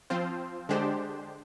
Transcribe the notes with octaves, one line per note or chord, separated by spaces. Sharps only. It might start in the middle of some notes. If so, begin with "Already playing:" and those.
F3 C4 F4 C5
D3 G#3 D4 G4 C5